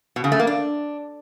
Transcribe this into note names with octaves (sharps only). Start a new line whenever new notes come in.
B2
C#3
A3
A#3
D4